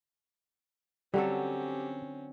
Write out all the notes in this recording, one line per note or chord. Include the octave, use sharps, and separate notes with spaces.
D3 F#3 G3 C4 C#4 G4 A4